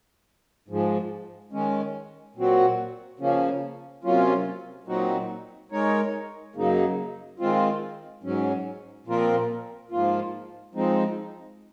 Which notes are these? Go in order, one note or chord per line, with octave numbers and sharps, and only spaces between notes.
G#2 F3 G#3
D#3 G#3 C#4
A#2 F#3 C4 F#4
C#3 F3 A#3 C#4
C3 F#3 A#3 C#4 F4
A#2 F#3 C4 D#4 F#4
G#3 D#4 A#4 C#5
F#2 C#3 F#3 A#3 D#4
D#3 G#3 C4 F4
G#2 F#3 C#4
A#2 F3 C4 F4 A#4
G#2 F3 A#3 F4
F3 G#3 C4 D#4